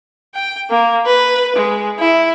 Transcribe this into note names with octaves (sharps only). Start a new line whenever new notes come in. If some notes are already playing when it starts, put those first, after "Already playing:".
G5
A#3
B4
G#3
E4